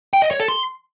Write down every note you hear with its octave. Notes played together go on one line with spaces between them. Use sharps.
G5
D#5
C#5
A4
C6